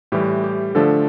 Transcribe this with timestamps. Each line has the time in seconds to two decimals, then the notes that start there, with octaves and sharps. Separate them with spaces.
0.12 A2 E3 G3 G4
0.44 G4
0.75 D3 F3 A3 D4 A4